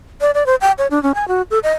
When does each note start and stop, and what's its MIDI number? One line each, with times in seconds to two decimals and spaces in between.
0.21 0.31 74
0.34 0.46 74
0.46 0.55 72
0.61 0.72 79
0.78 0.87 73
0.91 1.01 62
1.03 1.12 61
1.15 1.27 80
1.28 1.42 66
1.51 1.59 69
1.63 1.72 75